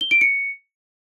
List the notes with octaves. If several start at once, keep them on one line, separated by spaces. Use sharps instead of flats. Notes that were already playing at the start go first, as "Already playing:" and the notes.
G7
D7
C#7